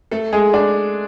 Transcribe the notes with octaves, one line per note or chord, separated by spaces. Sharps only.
A3 A4
G#3 G#4
D4 D5